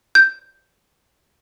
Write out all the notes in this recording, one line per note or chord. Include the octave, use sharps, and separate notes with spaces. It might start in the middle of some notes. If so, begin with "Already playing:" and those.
G6